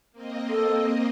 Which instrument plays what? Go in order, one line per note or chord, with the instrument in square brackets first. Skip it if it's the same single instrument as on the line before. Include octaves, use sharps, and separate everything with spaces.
[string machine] A#3 C4 D#5
[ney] A4